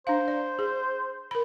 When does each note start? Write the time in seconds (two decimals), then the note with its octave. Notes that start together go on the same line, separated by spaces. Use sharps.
0.07 D4 C5 F5
0.28 D5
0.59 G#4
1.31 A#4 B5